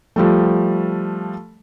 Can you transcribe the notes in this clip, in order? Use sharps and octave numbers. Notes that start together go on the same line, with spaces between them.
F3 G3 A3